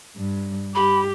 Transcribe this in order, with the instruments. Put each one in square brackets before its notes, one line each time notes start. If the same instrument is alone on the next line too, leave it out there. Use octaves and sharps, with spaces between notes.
[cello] G2
[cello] G2 G4 [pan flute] B5